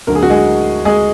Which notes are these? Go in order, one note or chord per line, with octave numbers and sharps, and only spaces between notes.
D2 D3 F#3 A#4
G#4
F#4
G#3 G#4
G#3 G#4